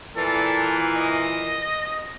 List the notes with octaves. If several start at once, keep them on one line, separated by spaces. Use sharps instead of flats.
A#2 E3 A4
D#5